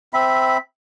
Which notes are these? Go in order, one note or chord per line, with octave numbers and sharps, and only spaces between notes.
C4 E5 B5